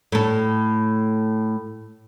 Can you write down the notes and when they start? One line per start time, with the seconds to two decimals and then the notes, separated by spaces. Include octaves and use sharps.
0.12 A2 A4